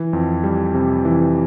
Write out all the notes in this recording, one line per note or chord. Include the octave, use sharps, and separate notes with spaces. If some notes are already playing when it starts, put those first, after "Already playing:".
Already playing: E3
F2
G3
C3
E3